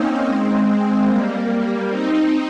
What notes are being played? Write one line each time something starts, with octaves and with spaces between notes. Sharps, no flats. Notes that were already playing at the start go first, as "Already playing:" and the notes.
Already playing: A#3 C4 C#4 D#4
G#3 C4
G3 A#3
C4 D#4